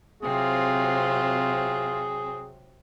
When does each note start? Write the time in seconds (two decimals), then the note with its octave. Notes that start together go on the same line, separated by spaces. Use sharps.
0.22 C3 F#3 C4 F4 G#4